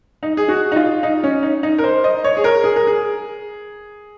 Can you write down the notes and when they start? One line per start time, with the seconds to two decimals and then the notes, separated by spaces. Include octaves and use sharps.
0.23 D#4
0.37 G#4
0.49 F#4
0.72 D#4
0.76 F4
1.03 D#4
1.24 C#4
1.43 D#4
1.63 D#4
1.78 A#4
1.84 C5
2.04 D#5
2.24 C#5
2.37 G#4
2.44 A#4
2.64 G#4
2.76 A#4
2.87 G#4